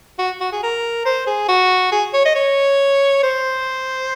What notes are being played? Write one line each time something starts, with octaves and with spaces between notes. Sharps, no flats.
F#4
F#4
G#4
A#4
C5
G#4
F#4
G#4
C#5
D#5
C#5
C5